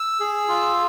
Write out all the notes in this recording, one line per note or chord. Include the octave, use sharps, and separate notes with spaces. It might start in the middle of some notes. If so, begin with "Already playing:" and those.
Already playing: E6
G#4
F4